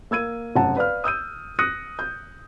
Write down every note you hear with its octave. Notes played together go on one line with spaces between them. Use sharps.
A#3 E6 G#6 D#7
F1 F#2 F#5 A5
B4 D5 F5 F6
D#6 E6 G6 D#7
D#6 F#6 A#6 C#7 D#7
G6